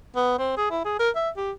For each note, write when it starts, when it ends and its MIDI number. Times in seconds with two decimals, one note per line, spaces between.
0.16 0.37 59
0.39 0.56 60
0.57 0.69 68
0.71 0.80 64
0.85 0.97 68
0.99 1.09 70
1.16 1.30 76
1.36 1.52 67